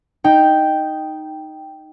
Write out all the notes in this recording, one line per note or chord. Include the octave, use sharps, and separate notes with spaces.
D#4 G5